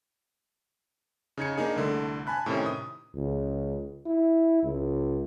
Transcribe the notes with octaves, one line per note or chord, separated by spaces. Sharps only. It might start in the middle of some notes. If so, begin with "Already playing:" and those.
C#3 D#4 G#6 C#7
A#3 D4 D#4 G#4
C2 D3 A3
G#5 A5 B5 F#6
A2 C3 D#3 C#4
D#6
C#2
E4
C#2